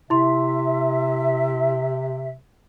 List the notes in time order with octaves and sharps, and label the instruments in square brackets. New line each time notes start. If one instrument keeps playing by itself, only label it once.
[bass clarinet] C3 [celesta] E4 C6 [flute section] E5